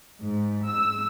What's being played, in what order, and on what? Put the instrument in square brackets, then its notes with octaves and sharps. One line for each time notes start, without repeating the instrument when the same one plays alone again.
[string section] G#2
E6